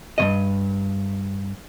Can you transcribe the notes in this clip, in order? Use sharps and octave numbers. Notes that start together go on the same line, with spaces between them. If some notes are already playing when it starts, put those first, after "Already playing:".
G2 B2 D#5